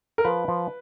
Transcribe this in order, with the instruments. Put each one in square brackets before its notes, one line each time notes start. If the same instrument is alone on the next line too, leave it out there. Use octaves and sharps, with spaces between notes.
[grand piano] A#4
[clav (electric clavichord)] F3 [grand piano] B4
[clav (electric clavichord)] F3